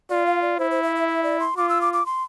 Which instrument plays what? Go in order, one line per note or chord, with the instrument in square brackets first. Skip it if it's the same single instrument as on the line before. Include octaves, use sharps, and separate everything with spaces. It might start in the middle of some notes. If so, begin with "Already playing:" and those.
[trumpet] F4 [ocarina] D5
[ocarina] F5
D5
[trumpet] E4 [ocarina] C5
[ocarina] C5
E5
E5
E5
D5
C6
[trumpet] F4 [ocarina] D6
[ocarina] E6
D6
D6
C6